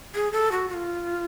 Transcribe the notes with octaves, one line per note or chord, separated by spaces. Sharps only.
G#4
A4
F#4
F#4
F4